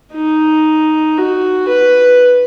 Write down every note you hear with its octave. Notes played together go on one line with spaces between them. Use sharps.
D#4
F#4
B4